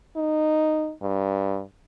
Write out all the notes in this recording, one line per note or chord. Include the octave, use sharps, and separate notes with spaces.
D#4
G2